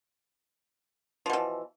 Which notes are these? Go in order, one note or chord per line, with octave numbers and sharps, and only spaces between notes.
B2 E3 F3